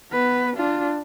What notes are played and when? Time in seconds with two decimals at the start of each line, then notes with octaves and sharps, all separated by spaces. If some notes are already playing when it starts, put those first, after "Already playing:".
0.12 B3 B4
0.56 D4 F4